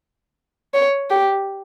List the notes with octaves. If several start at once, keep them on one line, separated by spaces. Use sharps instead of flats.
C#5
G4